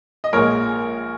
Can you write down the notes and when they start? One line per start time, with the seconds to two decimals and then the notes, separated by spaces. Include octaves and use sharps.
0.24 D#5
0.32 A#1 A#2 G#3 A#4 C#5